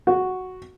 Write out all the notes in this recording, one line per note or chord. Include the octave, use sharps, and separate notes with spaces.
F#4